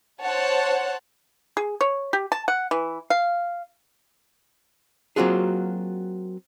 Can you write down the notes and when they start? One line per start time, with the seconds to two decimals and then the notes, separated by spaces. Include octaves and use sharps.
0.22 C5 C#5 F#5 A5
1.57 G#4
1.81 C#5
2.13 G4
2.32 A5
2.48 F#5
2.71 E3
3.10 F5
5.16 F#3 A#3 C4 F4 F#4 G#4